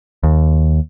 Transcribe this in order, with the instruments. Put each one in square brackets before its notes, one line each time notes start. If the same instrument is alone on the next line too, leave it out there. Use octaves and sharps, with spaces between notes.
[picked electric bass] D#2